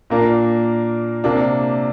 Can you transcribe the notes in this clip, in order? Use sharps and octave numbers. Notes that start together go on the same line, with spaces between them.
A#2 A#3 D4 A#4
C3 A#3 D4